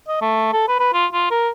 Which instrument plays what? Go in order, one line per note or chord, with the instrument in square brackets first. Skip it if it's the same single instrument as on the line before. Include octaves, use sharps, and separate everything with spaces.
[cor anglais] D#5
A3
A4
B4
B4
F4
F4
A#4